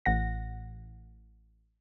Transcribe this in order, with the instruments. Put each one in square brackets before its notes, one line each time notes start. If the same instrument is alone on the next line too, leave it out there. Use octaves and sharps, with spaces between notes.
[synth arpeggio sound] A1 F#5 A#6